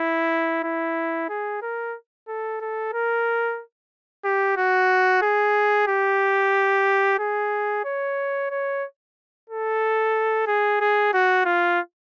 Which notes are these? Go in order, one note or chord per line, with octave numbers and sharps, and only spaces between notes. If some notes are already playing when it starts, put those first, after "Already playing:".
Already playing: E4
E4
G#4
A#4
A4
A4
A#4
G4
F#4
G#4
G4
G#4
C#5
C#5
A4
G#4
G#4
F#4
F4